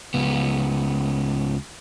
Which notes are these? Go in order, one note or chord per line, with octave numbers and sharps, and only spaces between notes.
C#2 B3